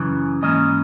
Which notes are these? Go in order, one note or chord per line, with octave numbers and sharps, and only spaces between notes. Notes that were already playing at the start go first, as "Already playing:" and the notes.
Already playing: F#2 C#3 E3
G#2 E3 A#3 C#4 D#5